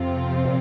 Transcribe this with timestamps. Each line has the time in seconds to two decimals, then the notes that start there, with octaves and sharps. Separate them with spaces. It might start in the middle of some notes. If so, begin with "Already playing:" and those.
Already playing: F2 C3 F3 C4 F4
0.45 A#2